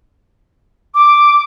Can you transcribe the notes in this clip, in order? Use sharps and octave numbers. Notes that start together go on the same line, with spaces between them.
D6